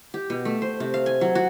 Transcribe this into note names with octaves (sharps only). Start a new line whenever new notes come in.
G4
B2
A3
C5
C3
F5
G#5
F#3
F#4